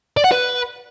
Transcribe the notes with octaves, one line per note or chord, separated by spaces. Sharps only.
D5
F#5
B4